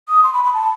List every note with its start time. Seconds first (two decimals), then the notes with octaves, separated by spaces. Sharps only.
0.09 D#6
0.24 C6
0.34 B5
0.44 B5
0.54 A5